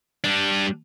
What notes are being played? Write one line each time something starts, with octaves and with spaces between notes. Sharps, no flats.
G3 D4